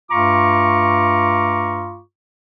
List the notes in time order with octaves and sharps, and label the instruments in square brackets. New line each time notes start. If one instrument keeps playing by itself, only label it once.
[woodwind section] G2 A3 F4 A#5 C#6 D6